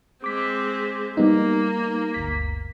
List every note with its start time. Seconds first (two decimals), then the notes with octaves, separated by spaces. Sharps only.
0.24 G#3 C4 D6 B6
1.17 G3 A#3 B3 D#4
2.14 G1 D2 B6